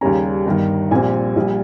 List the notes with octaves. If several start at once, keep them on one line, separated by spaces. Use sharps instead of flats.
D#2 C#3 G3 C#4 A#5
G1 G2 D#3
A#1 A#2 G3 C4 G#5
A#1 A#2 G3